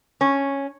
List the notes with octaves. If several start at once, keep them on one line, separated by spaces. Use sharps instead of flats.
C#4